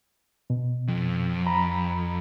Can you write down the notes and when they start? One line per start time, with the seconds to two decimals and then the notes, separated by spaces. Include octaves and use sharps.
0.50 B2
0.88 F2
1.47 A#5 B5